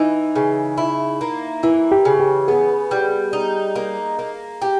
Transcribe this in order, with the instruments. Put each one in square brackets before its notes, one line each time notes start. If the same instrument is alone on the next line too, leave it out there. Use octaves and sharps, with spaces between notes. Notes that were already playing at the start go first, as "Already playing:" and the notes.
Already playing: [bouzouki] E3 [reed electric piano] D#4
[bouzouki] C#3
E4
A#3
[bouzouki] E3 [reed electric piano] E4
[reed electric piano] G4
[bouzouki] C#3
[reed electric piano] G4
[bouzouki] B3 [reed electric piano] G#4
[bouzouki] G3
D#4
A#3
A#3
G4